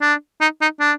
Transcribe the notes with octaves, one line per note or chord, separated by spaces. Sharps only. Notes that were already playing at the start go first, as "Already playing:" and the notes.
D4
D#4
D#4
D4